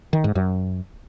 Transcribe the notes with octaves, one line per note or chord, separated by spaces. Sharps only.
D#3
G#2
F#2